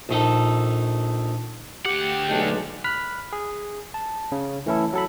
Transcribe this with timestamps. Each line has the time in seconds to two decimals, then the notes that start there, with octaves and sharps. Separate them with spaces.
0.09 A#1 D#4 A4
1.85 D2 G4 F#5
2.29 B1 G#3 D4
2.84 B5 F6 F#6 B6
3.33 G#4
3.94 A5
4.32 C#3
4.66 E3 A3 C#4 E4 A4
4.93 F#3 A4 B5